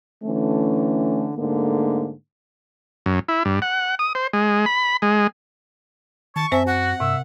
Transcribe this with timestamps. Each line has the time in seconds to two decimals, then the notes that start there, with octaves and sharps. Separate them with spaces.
0.24 D3 E3 A3 C#4
1.36 G#2 D3 A3 A#3
3.06 F#2
3.29 E4
3.45 G2
3.62 F#5
3.99 D#6
4.15 C5
4.33 G#3
4.66 B5
5.02 G#3
6.36 D#3 A5 C#6
6.52 F#2 C4 C5 E5 G#5
6.67 F#4 F#5
7.00 G2 C3 E5